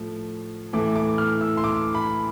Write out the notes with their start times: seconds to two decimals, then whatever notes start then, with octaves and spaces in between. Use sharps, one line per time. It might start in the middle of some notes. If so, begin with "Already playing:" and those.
Already playing: A2 F3 A3
0.73 A2 E3 A3 D6
0.96 D6
1.18 F6
1.41 E6
1.57 C6
1.64 D6
1.95 B5